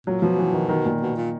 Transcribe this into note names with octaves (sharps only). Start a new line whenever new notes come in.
A#2 F#3
B2 F3
E3
D#3
D#3
A#2
B2
A#2